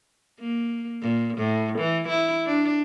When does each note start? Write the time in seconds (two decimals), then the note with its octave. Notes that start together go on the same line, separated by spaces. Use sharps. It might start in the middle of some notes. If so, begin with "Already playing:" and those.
0.40 A#3
1.01 A#2
1.38 A2
1.79 E3
2.09 E4
2.47 D4